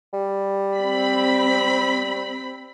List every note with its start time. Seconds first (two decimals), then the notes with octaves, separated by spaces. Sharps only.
0.13 G3
0.77 C4 B5